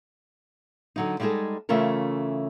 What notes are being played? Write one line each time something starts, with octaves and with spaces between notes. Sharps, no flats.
D3 F#3 D#4
G3 G#3 D#4 F4 G#4 A4
C#3 E3 A3 C#4 F4 A#4